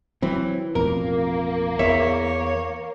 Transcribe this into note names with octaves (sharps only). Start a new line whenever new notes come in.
E3 F#3 C4
A1 F2 B2 A#3 A#4
E2 C#5 E5